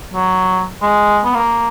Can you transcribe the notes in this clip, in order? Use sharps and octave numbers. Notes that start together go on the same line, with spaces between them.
F#3
G#3
B3
A#3